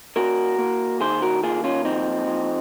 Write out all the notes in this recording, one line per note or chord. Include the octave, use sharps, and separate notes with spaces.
A#3 F#4 A#4
A#3
D#3 G#4 C5
F#4 A#4
A#3 F4 G#4
C#4 F4
F3 C4 D#4
F3